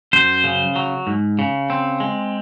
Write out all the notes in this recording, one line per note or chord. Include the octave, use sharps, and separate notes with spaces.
F#2 C5
C#3
F#3
G#2
C#3
C4
G#3